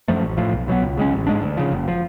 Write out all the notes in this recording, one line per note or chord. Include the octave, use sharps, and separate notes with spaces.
F#2 F3 A3
A1
A2 F3
B1
B2 F#3 B3
C#2
C#3 G#3 C#4
A1
G#2 G#3 D4
D2
C#3 F3
F#1
F3